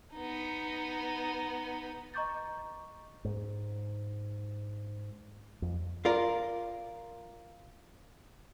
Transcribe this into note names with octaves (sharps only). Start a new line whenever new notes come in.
B3 D#4
D#5 A#5 C#6 D6 G6 A6
G#2
F2
F4 A#4 D5